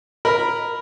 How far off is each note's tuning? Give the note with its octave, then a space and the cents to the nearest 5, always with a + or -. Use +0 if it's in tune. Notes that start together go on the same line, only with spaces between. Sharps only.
A#4 +0 D#5 +0 B5 +0